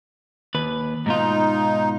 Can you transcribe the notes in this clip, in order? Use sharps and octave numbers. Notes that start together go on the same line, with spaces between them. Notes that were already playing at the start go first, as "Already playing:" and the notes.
D#2 B4
G#2 B2 D#4 F4